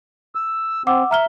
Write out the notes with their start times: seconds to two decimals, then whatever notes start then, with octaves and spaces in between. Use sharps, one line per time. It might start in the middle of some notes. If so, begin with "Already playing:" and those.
0.35 E6
0.87 C4 F#5 D6 E6
1.11 E5 A#5 F6 G7